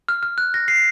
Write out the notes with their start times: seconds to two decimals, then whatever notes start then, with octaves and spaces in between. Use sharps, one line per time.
0.08 F6
0.23 F6
0.38 F#6
0.54 A#6
0.68 C7